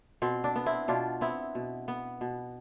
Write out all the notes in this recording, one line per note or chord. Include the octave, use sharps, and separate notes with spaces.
B2 C4
D4
B3
C4 E4
B2 D4 F4
B3 C4 E4
B2
B3
B2